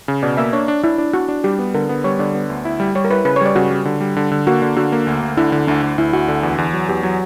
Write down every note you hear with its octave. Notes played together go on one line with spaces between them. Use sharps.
C#3
B2 D5
A#3 E5
D4 C#5
D4
D4 E4
D4
D4 F#4
D4
G3 G4
B3
D3 A#4
B3
G3 C#5
D3 D5
B3
D2
E4
G3
G3 C#5
A#4
E4 B4
C#3 B4
C#5
G3 D5
C#3 F#4
G3
D3
G3
D3
D3
A#3 F#4
D3
D3 F#4
A#3
D2
D2
D3 E4
D3
D2 D4
D2
D2 E4
D2 F#4
D3
E2
E2
F#3
E2 G4
F#3